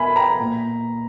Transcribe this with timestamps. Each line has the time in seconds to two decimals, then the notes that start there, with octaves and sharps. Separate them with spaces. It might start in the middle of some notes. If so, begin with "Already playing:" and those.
Already playing: B2 A#4 E5 G#5 B5
0.16 G5 A#5
0.40 A#2